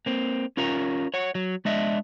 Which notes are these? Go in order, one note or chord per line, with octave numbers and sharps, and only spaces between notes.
A#3 C4
C#4 F4 A#4 A#5
C#5 F#5
F#3
G#3 D4 D#5 E5